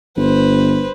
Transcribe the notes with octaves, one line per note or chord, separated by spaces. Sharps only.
G1 B4 C5